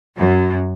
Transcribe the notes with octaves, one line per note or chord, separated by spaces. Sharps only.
F#2